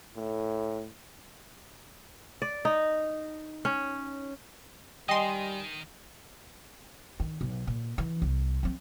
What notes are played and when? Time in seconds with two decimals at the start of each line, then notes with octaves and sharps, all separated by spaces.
0.16 A2
2.42 D5
2.65 D#4
3.65 C#4
5.09 D#3 G3 D#5 G5 G#5 C6
7.20 D#3
7.41 B1
7.67 A#2
7.98 E3
8.22 C2
8.63 F3 C4